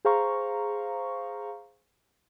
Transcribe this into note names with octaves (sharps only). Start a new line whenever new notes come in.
G#4 C5 F5 A#5 C#6